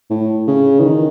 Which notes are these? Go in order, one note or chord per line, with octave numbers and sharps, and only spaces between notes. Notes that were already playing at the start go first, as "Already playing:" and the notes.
A2
C#3
E3
D#3